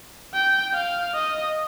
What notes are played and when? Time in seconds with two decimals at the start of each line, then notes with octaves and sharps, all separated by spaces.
0.34 G5
0.74 F5
1.14 D#5